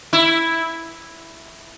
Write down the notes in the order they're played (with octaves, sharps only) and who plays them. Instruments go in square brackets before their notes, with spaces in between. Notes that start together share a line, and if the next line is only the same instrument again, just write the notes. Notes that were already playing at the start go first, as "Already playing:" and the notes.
[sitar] E4